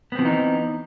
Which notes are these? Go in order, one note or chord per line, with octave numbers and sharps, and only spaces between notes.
E3 F3 B3 C4 D#4